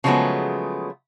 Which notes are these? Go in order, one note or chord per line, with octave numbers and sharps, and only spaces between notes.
C#3 F3 F#3 G#3 A3 B3